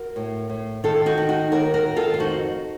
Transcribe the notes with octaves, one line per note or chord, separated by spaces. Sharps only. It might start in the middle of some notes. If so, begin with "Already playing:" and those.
Already playing: F#4 A#4
A2
A2
D#3 F4 A4
D#4 F#4
D#3
D#4 F#4
D#2 F#4 A#4
F#4 A#4
D#3
F4 A4
F4
F2 D#4 F#4